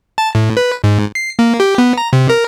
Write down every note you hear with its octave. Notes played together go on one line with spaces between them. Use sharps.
A5
A2
B4
G#2
C7
A#3
G4
B3
A#5
C3
A#4